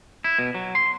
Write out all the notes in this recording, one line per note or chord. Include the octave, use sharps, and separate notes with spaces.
E4
B2
F#3
C6